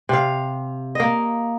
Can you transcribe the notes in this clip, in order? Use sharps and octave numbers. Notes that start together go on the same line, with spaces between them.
C3 F5
A#3 D#5